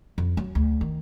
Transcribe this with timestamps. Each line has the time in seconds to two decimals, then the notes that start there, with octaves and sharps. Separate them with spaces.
0.18 F2
0.37 F#3
0.55 D2
0.81 D#3